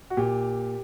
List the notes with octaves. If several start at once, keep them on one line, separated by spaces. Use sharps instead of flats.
F#4
A#2 G4